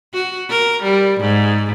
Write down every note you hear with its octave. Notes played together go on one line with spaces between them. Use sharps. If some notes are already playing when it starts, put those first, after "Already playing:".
F#4
A#4
G3
G#2